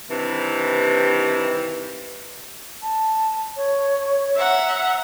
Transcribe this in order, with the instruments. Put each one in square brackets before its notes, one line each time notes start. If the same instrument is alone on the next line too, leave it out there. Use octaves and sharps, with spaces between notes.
[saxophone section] G2 C3 D#3 E3
[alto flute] A5
C#5
[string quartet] E5 F#5 A#5